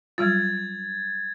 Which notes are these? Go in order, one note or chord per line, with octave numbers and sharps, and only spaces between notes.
F#3 G3 F4 G#6 A6